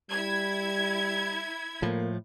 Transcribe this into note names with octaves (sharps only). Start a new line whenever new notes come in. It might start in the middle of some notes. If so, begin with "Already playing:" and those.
G3 E4 G#6
A2 F3 A#3